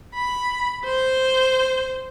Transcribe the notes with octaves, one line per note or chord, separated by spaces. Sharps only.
B5
C5